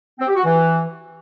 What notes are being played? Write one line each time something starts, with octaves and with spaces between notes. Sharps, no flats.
C4
G4
F#4
E3